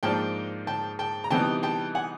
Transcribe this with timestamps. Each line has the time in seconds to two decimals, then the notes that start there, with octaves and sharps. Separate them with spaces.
0.03 G#2 F3 A#3 D4 G5 A5
0.67 G5 A5
0.99 G5 A5
1.24 A#5
1.31 C3 E3 G3 B3 D#4 G5 A5
1.63 G5 A5
1.95 F#5 G#5